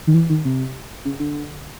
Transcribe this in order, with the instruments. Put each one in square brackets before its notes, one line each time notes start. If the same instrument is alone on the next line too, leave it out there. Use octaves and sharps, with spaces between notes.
[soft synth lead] D#3
E3
D#3
C3
C#3
D3